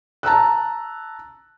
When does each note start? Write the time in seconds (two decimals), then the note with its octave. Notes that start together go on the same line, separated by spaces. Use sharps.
0.23 A5 A#5 E6 F#6